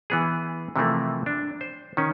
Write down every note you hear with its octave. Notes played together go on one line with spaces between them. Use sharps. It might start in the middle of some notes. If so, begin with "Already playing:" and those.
E3 B3 G#4
C3 E3 F3 A3 A#3
D4
C5
D#3 C#4